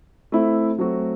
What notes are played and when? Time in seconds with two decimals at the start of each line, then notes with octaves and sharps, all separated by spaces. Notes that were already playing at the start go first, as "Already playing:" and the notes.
0.32 A3 C4 E4
0.78 F#3 A3 C4 F#4